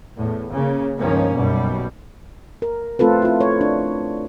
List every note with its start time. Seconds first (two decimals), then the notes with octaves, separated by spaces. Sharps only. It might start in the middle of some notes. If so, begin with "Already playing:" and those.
0.16 E2 A2
0.51 C#3 A#3
0.99 C#2 G2 D#3 F3 A#3 C#4
1.33 B1 F#2 B2 G3
2.62 A#4
2.99 A3 C4 F4 A4 B4
3.22 E4 F4
3.41 C#5
3.61 D4